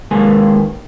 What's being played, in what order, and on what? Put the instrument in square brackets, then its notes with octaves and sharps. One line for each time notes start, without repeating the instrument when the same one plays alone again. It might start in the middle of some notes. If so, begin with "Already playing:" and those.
[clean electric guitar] D#2 G#3 A#3 B4 G#5